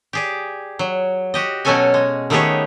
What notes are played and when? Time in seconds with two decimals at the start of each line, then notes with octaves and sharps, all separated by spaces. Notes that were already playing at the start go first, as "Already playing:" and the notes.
0.13 G4 G#4 D5
0.79 F#3
1.34 F#4 G4 D#5
1.65 B2 F#3 C#4 A4 C#5 G#5
1.94 G#3
2.30 D#3 A3 B3 G4 G#4 C#5